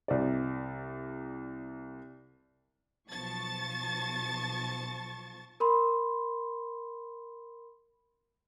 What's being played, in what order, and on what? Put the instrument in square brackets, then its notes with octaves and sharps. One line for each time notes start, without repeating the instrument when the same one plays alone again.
[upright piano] C2 D5
[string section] B1 F3 A5 C#6 A6
[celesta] A#4 B5 C6